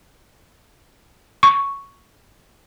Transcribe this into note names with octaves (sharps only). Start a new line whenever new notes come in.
C#6